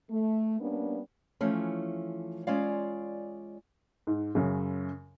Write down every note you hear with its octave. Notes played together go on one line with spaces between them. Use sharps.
A3
G3 A#3 B3 C#4 D4
E3 F3 A3 C#4
G#3 C#4 F4 D5 F5
G#2
F#2 C#3